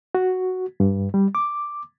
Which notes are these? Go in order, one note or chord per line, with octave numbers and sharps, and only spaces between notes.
F#4
G2
G3
D6